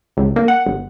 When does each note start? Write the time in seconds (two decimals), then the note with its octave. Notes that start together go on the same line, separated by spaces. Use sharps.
0.17 C#2
0.36 A#3
0.48 F#5
0.66 G1